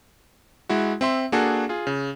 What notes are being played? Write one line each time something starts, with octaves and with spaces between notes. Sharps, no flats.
G#3 E4 F#4
C4 E5 C6
A#3 D4 F#4 G#4 A4
F4 G#4
C#3